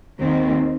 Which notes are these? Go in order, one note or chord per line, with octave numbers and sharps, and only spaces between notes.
D#2 D#3 C4